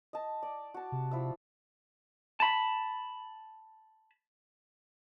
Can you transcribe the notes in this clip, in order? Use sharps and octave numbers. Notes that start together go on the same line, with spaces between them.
D#5 A5
D5
F#4 A5
C3
F3 E4 E6
A5 B5